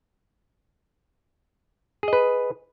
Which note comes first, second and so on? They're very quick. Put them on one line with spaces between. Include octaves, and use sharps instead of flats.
G#4 D#5 B4